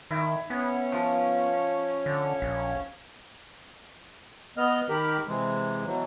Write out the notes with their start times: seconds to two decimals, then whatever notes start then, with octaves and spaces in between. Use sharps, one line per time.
0.11 D#3 E4
0.50 B3 C#4 C#5
0.92 F3
2.06 D3
2.42 A#1
4.57 B3 D#5 F6
4.89 D#3 G4 A#4 B5
5.28 C3 E3 G#3
5.86 B2 E3 F#3